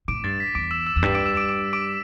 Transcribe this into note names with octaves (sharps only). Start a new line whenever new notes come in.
A2 D6 D7
G2 A6
B6
E2 D6 D7
E6 E7
E6 E7
E2
G2 B6
D6 D7
E6 E7
D6 D7
D6 D7
D6 D7